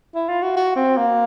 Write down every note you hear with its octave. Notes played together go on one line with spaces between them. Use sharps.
E4
F4
F#4
F#4
C4
A#3